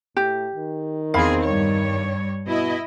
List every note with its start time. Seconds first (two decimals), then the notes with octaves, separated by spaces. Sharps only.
0.17 A2 G4
0.55 D#3
1.14 E2 C4 G#4 F5 B5
1.44 G2 G3 C#5
2.47 B2 E4 D#5